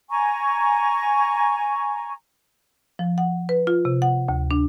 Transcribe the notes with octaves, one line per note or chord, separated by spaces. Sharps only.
G#5 A#5 C#6
F3
F#5
B4
F4
C3
F#5
D2
D4